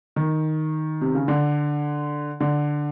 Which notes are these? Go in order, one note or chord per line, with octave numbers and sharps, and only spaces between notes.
D#3
C3
C#3
D3
D3